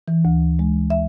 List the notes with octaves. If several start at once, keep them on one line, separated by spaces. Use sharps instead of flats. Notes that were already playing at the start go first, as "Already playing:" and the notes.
E3
D2
G#3
E5